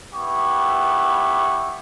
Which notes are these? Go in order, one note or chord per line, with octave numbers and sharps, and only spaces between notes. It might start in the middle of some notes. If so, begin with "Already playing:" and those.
B3 E4 G4 C#6